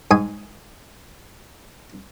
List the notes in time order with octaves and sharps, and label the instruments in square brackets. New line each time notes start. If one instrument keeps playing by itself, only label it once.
[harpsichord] G#2 G#5 D#6